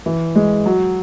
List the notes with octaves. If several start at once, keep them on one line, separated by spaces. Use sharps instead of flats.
E3
G#3
F#3